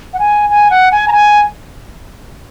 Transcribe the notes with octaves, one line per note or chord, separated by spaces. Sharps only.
F#5
G#5
G#5
F#5
G#5
A#5
G#5